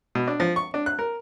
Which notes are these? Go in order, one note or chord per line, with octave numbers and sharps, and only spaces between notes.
B2
D4
F3
C#6
D4
F#6
A#4